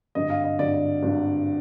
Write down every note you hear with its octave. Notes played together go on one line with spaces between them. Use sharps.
G#1 G2 D3 D#5
F5
D#5
G#1 G2 D3 D5
G#1 G2 D3